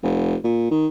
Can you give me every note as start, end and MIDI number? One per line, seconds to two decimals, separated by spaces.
0.03 0.36 29
0.44 0.69 46
0.71 0.88 51